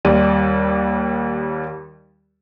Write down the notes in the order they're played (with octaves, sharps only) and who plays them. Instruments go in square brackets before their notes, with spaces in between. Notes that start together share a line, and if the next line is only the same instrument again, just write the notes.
[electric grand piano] D#2 G3 D5 D#7